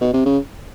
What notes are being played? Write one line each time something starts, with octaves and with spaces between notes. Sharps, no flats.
B2
C3
C#3